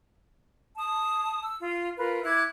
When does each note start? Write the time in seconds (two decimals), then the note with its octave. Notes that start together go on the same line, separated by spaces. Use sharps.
0.76 A5 D#6
1.43 E6
1.61 F4
1.97 F4 A#4 B4
2.24 E4 D6 F#6 G#6